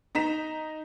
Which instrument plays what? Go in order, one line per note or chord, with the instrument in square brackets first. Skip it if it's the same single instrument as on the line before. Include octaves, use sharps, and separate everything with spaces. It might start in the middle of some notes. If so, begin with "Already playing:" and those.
[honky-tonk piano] D#4 A#5 B6 E7